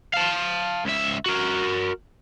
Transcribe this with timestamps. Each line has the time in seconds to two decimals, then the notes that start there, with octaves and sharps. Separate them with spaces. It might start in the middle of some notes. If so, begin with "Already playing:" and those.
0.14 F5 A5
0.85 C#2 E5
1.26 F#4 A#4